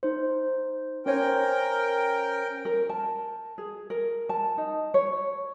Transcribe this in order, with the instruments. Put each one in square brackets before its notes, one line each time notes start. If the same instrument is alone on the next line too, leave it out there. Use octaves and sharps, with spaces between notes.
[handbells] D#4 C5
[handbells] C#4 C5 C#5 [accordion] A#4 G5
[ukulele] A#4
A5
G#4
A#4
A5
D#4
C#5